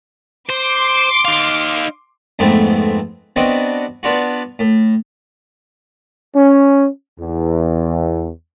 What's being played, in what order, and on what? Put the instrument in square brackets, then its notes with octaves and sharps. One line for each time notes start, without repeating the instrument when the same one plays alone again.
[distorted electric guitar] C5 [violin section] C6 D6
[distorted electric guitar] D#4 F5
[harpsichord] F2 G#2 A3 B3 C4
B3 C4 D4 F#4 D#5
B3 D4 F4 F#4
A2
[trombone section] C#4
E2